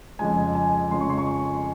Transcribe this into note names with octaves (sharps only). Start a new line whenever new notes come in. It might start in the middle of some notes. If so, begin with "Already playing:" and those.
F2 C#3 F3 G#3 G#5
G#5
F2 C#3 F3 G#3 C6
C#6
C6
C#6